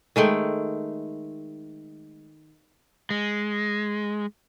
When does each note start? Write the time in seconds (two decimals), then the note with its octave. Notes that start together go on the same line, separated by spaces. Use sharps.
0.16 D#3 G#3 A3 G5
3.10 G#3